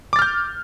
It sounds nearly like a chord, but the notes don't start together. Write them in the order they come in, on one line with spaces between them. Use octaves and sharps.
D6 A6 F6 G6